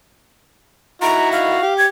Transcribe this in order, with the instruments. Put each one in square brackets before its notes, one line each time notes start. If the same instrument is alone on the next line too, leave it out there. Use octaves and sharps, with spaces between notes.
[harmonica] D#4 E4 F#4 [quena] A#5
[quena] F5
[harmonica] G4
[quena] G#6